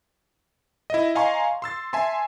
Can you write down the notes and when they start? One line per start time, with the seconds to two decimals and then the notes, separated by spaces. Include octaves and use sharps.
0.90 E4 D#5
1.15 D#5 F5 G#5 A#5 C6 C#6
1.62 C6 E6 A6
1.93 E5 G#5 A5 C6